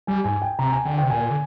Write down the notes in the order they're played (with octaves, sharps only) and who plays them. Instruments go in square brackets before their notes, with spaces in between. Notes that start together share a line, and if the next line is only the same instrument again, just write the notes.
[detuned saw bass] G3 [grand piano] G#5
[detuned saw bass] G#2 [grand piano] G#5
[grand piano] G5
[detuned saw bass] C3 [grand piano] A#5
[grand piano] G#5
[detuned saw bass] D3 [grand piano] G5
[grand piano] G5
[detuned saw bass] C3
[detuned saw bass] A#2 [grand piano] G#5
[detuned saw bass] D3